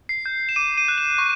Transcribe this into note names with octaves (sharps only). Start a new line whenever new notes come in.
C7
G6
E7
D6 D#7
D#7
F#6
E7
C#6